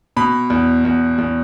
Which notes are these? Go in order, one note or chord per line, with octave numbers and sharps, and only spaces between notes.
B2 B5
E2
E2
E2